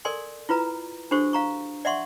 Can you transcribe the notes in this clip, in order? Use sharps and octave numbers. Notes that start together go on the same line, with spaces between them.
A4 A#4 D5 G#5 C6
E4 F4 B4 A#5
D4 F#4 G4 A4 C5 C#6
F5 A#5 C#6
D5 E5 F#5 C6 C#6